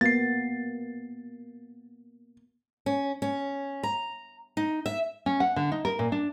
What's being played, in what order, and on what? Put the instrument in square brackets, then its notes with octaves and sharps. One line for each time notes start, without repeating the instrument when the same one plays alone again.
[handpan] A#3 B3 F#4 [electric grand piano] A6 C7
[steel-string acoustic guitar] C#4
C#4
A#5
D#4
E5
[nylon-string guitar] C#4
F#5
D3
D#4
A#4
A#2
D4